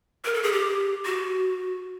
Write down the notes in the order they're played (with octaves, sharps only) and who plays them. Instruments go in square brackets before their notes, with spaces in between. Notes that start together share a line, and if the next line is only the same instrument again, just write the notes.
[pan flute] A#4
A4
G#4
G4
F#4